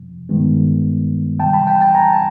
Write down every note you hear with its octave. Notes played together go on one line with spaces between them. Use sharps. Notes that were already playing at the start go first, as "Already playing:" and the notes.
Already playing: F2 C3 F3
G2 D#3 G#3 B3
C3 E3 G3 G5 A5
A5 B5
G5 A5
G5 A5
G#5 A#5
A5